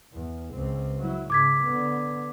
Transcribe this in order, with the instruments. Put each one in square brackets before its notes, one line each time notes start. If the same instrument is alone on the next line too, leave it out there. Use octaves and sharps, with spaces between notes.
[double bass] E2
C#2 C4
F#3 E4
[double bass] G#2 C#3 [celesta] D6 G#6 B6
[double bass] D3 B3